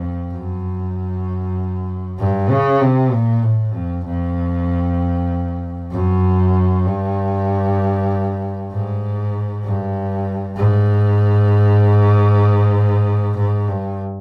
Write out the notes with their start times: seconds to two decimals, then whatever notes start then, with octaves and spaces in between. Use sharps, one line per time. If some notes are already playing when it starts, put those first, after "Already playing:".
Already playing: F2
0.32 F#2
2.19 G2
2.50 C#3
2.81 C3
3.12 A#2
3.43 A2
3.74 F2
4.05 F2
5.91 F#2
6.85 G2
8.72 G#2
9.64 G2
10.57 G#2
13.37 G#2
13.68 G2